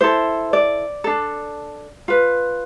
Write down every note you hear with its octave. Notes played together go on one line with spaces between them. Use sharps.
E4 A4 C5
D5
D4 A4
F4 B4